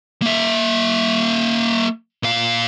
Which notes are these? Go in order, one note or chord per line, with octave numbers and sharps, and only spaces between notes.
A#3 E5
A#2 F5